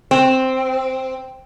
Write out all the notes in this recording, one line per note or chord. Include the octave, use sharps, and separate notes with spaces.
C4